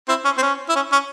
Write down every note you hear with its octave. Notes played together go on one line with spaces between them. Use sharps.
C4 E4
C#4
C4
C#4
E4
C#4
C#4